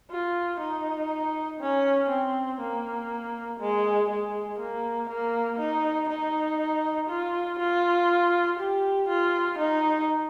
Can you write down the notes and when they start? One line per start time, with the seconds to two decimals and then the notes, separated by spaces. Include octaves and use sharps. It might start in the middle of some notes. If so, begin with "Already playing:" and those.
0.11 F4
0.60 D#4
1.60 C#4
2.10 C4
2.61 A#3
3.60 G#3
4.10 G#3
4.60 A#3
5.09 A#3
5.59 D#4
6.09 D#4
7.09 F4
7.59 F4
8.59 G4
9.09 F4
9.58 D#4